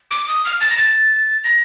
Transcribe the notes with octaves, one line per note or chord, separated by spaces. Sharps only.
D6
D#6
F6
A6
A#6
A6
A#6